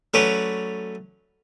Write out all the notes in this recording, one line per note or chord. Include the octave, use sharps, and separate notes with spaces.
F#3 A3 C#4 B4 C#5 D5